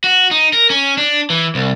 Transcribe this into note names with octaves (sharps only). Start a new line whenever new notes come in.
F#4
D#4
A#4
C#4
D4
E3
C2